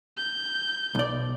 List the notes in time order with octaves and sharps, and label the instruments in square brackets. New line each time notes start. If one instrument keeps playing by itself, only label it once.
[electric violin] G6
[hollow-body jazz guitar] B1 D5